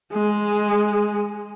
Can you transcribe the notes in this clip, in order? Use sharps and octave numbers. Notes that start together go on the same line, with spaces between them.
G#3